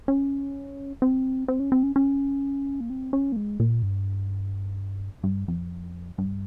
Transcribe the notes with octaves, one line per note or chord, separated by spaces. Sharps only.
C#4
C4
C4
C#4
C4
C#4
C#4
A#3
C4
C#4
A#3
G#3
A#2
G2
G2
F2
G2